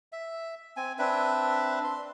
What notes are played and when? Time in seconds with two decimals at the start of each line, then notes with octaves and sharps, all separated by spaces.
0.12 E5
0.77 C4 G#5
0.99 C4 D4 B4 E5
1.84 C6